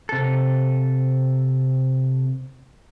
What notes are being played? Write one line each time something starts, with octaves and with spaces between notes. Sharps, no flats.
C3 A4